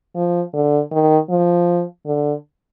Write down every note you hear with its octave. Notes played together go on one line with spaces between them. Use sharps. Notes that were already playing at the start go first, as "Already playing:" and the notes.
F3
D3
D#3
F3
D3